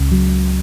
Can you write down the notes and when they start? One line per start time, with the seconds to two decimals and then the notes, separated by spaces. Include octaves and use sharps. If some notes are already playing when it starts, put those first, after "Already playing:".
Already playing: C#2 C#3
0.12 F#3